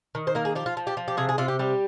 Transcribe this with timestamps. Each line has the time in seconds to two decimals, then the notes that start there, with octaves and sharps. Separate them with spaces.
0.15 D#3
0.27 C5
0.35 A#3 A#4
0.45 G#4
0.55 F3 G4
0.66 F4
0.77 F3
0.87 G4
0.97 F3
1.08 G4
1.17 C3 G#4
1.29 G#4
1.38 C3 F4
1.48 G4
1.59 G3 G4